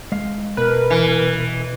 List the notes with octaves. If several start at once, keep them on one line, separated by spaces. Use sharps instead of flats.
G#3 F5
B2 A#4 B4
E3